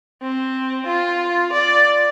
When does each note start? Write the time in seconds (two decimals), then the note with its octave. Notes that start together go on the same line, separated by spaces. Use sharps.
0.22 C4
0.87 F4
1.53 D5